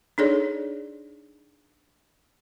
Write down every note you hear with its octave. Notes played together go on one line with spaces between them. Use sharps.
D4 D#4 G#4 A4 C#5 D5